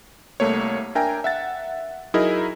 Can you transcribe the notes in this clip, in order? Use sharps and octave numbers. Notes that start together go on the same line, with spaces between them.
C2 A3 A#3 C#5
D4 A#4 E5 G5 G#5 A#5
E5 F#5 A6
F#3 D#4 E4 G#4 A#4 D#5